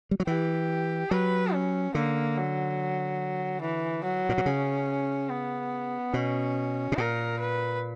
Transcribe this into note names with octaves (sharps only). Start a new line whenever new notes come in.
G3
F#3
E3 G4
F#3 B4
C#4
D3 A#3
F#3
E3
F#3
A#2
B2
C#3 C#4
B3
B2 C#4
B2
A#2 A#4
B4